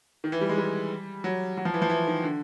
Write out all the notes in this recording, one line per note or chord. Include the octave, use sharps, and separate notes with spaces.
D#3
E3
G3
G#3
G3
F#3
F#3
F3
E3
F3
E3
D#3
D3